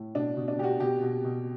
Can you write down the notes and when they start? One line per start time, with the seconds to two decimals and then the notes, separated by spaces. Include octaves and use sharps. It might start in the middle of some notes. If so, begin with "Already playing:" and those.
Already playing: A2
0.15 B2 D4
0.37 B2
0.48 D4
0.59 B2 G4
0.63 F#4
0.80 B2 G4
1.02 B2
1.24 B2